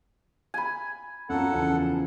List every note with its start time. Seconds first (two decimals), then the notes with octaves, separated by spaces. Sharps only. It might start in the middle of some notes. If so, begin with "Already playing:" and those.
0.54 G#5 B5
1.29 F#2 F4 A4 F#5 A#5
1.53 E2 C#3 F3